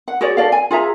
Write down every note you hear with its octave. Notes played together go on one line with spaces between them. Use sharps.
F#5
F#4 G#4 C#5 D5
F#4 A4 D5 F5
G#5
F4 G#4 E5 A#5